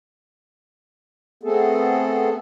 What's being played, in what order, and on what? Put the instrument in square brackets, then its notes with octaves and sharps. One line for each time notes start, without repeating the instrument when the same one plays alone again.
[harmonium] A3 B3 C4 G#4 A4